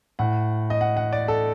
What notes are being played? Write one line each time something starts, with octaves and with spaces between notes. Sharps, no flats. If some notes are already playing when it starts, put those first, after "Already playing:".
A2 F#5
D#5
F#5
F#5
D5
A4